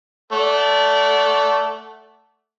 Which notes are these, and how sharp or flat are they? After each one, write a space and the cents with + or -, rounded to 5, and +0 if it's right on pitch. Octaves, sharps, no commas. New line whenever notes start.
A3 +0 D5 -25 F#5 +0